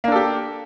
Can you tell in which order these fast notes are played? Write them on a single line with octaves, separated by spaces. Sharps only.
A#3 D4 A4 G4